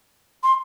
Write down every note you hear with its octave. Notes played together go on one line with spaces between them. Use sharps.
C6